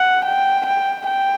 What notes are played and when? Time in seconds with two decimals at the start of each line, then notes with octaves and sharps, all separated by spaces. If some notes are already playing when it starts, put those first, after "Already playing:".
Already playing: F#5
0.25 G5
0.66 G5
1.07 G5